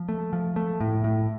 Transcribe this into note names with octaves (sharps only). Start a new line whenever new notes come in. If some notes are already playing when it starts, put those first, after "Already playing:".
Already playing: F3
A3
F3
A3
A2
A2